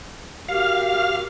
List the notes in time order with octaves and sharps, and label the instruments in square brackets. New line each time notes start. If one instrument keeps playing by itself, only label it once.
[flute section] F#4 G4 A#4 [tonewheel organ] F5